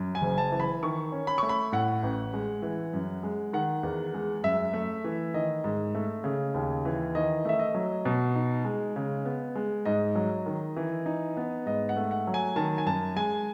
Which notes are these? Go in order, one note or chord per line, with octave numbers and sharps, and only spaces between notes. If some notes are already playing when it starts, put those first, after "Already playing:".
Already playing: F#2
G#5
F#1
A5
E3
B5
D#3 C#6
C#4
B5
A3 C#6
B5
A2 F#5
A1
G#3
E3
F#2
G#3
D#3 F#5
E2
G#3
F#2 E5
A3
E3
D#3 D#5
G#2
A3
C#3
D#2
E3
D#3 D#5
A3 E5
D#5
F#3
B2
D#4
G#3
C#3
B3
G#3
G#2 D#5
F#3
D#3
E3
D#4
B3
G#2 D#5
F#5
A3
F#5
F#3
G#5
D#3 A5
G#5
F#2 A5
G#3 G#5